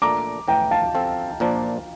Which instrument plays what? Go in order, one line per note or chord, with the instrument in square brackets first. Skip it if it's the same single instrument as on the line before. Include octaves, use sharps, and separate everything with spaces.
[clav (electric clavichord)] A#2 A3 D4 A4 [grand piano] A#5 D6
[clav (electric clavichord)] A2 E3 A3 [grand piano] G5 A#5
[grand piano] F5 A5
[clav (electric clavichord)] F3 C4 F4 A4
A#2 F3 A#3 D4